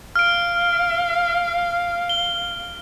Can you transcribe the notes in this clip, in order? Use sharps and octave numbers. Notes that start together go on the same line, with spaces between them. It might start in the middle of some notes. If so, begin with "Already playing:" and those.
F5 F6 D7
G7